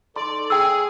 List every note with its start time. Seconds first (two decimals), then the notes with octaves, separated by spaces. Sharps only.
0.16 D#4 A4 D5 C6
0.50 G#4 G5 E6